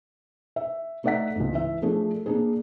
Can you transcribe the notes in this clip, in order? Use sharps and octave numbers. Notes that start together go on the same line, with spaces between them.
E5
A3 D#4 D5 E5 F#5 B6
C#2 G#2
E3 E5
F3 A3 D4 G#4
A#3 D4 G#4